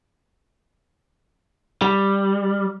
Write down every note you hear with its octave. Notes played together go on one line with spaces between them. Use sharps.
G3